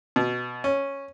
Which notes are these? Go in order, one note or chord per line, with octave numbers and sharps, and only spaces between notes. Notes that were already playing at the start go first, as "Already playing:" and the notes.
B2
C#4